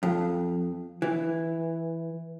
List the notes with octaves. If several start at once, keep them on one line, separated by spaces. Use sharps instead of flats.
F2
E3